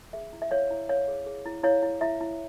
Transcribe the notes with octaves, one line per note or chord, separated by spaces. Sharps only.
G#4 E5
E4
E5
E4 C#5 F5
E4
C#5 F5
G#4
G#4
E4
E4 C#5 F5
E4
E4 E5
E4